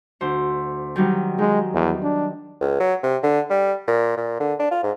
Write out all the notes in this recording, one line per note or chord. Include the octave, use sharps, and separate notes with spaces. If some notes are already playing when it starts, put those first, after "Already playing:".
D2 C5
D#3 F#3 G3
D#3 G#3
E2
D4
C#2
F#3
C3
D3
G3
A#2
A#2
D3
D4
F4
G#2